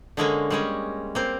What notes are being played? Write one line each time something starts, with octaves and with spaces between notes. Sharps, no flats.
D3 G#3 A#3 C#4
G3 G#3 C#4
A#3 C4